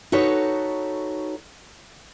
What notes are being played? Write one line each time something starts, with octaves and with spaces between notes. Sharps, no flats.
D#4 F#4 A4 B4 C#5